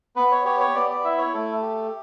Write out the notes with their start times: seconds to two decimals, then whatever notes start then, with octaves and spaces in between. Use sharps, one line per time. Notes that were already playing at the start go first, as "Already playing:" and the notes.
0.16 B3 B4
0.31 C#5
0.45 G4 C#5
0.60 C#5
0.75 B3 D5
0.89 D5
1.04 E4 E5
1.18 C#5
1.33 A3 A4
1.62 G4